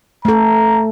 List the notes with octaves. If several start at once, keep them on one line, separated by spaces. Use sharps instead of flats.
A3 A4 A#5